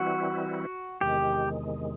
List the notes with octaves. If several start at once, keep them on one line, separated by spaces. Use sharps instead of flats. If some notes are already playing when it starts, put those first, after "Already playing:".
Already playing: E3 G3 C4 E4 F#4
E2 C3 D#3 G#3 G4